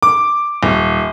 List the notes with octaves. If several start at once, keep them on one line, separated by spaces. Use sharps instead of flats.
D6
D#1